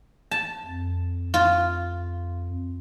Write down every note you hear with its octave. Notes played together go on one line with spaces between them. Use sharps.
A5
F2
F4